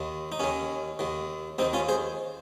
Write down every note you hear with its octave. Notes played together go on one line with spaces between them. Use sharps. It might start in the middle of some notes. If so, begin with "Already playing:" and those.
Already playing: D#2 D#3
D#4
D#2 D#3 C#4
D#2 D#3
D#2 D#3 C4 D#4
C#4 F4
G#4 C5